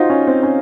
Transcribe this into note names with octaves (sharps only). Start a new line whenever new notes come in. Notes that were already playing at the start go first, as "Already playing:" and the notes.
Already playing: D#4 F4 F#4 C5
C#4
C4
C#4